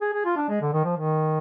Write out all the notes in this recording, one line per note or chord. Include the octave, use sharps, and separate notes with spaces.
G#4
G#4
F4
D4
G#3
D3
D#3
F3
D#3